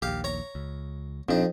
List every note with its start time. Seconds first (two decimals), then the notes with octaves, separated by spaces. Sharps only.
0.02 A#1 D#2 G4 F5
0.24 C#5 A#5
0.55 C#2
1.29 A#1 F2 C4 D4 D#4